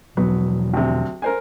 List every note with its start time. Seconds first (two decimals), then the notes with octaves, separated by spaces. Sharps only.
0.17 E2 B2 F3 F#3 B3
0.73 D2 C3
1.22 A#4 C5 G#5